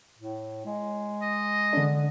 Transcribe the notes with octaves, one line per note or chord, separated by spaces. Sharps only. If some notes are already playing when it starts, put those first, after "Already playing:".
A2
G#3
D#5
D3 D4